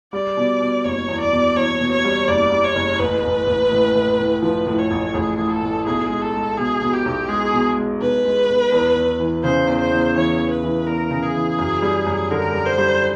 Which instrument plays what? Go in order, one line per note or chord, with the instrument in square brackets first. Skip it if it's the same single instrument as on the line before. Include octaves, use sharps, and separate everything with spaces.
[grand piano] G3 [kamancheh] D5
[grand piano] B2
B2
[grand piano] F#1 [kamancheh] C#5
[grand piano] E2
[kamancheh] D5
[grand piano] B2
[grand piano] E2 [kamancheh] C#5
[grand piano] B2
[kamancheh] C#5
[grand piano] G3
[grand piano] F#1 [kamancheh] D5
[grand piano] G3
[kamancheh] C#5
[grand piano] F#1
[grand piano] A1 [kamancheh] B4
[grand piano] A1
A1
A2
A2
A2
[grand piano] F3 [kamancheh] B4
[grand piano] A2
[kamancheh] C#5
[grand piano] A1
[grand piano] A1 [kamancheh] G#4
[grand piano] A2
[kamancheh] A4
[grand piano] A2
[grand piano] B1 [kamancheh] G#4
[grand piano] G#3
[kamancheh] A4
[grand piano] G#3
[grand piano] B2 [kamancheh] G#4
[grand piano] B2
[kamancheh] G4
[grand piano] B1
[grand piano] G#3 [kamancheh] G#4
[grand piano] B2
G#3
[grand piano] B1 [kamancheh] B4
[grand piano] G#3
B1
E2
E2
E3
[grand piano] C#3 [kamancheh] C5
[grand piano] E2
[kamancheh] C5
[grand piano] E2
[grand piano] E3 [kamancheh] C#5
[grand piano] E2
[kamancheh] B4
[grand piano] E3
[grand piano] E2 [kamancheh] A#4
[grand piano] C#3
[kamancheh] G#4
[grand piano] E3
F#2
G3
F#2
[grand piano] D3 [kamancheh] A#4
[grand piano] G3
[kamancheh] C5
[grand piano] G3